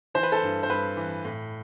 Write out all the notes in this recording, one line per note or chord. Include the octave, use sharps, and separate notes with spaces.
E3 C5
B4
A4 C5
G2
C5
G2 B4
E3
A2